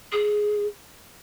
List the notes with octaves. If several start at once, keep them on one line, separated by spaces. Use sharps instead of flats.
G#4